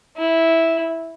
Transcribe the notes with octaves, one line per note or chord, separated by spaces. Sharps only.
E4